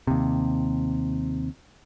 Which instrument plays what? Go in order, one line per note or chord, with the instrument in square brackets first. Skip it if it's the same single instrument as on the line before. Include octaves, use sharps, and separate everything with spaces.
[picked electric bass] D#2 C3